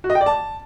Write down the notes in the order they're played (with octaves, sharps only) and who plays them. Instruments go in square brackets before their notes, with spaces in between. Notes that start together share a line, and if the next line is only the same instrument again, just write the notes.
[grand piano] F#4
D#5
G5
D5
A5